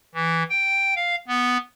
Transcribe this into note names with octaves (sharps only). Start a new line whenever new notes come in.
E3
G5
F5
B3